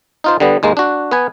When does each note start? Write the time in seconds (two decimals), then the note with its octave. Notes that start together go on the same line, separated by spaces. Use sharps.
0.24 D#4 F4 C5
0.40 D3 G3 B3
0.63 D#2 G#3 A#3
0.77 D4 F#4
1.11 B3 B4 G#5